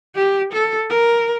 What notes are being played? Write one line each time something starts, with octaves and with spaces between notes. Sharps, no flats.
G4
A4
A#4